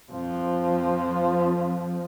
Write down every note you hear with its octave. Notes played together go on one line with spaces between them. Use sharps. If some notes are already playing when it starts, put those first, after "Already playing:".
F2 F3